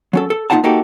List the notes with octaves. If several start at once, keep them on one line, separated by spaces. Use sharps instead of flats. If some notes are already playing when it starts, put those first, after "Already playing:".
F#3 C#4 A4
A4
A#2 A#3 D#4 F4 F#5 A5
A#3 D#4 F#4 G4 A4